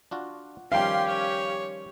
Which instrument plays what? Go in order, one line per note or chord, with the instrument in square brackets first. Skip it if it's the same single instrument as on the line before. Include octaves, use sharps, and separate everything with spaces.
[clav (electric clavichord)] D4 F4 F#4
[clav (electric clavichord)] D#3 F3 G3 [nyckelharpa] C#4 G4 [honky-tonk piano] F5 G5 [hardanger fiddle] C6
[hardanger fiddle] C#5